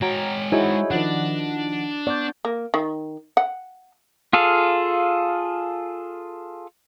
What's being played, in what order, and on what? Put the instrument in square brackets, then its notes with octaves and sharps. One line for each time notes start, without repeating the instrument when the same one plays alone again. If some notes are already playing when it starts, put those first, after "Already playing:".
[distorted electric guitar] G#3 G5 [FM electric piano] F#4 A#5 [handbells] C#5
[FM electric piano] D#4 G#4 E5 [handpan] E4 F#4 [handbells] C5 C#5
[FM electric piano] D#3 F3 F#5 [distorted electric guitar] D4 [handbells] D#5
[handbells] B3 G6 [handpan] D5
[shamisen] A#3
D#3
F#5
[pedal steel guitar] F4 G#4 A4 F5